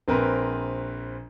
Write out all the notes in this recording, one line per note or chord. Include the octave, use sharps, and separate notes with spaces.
A#1 C4 A#4 B4 A#5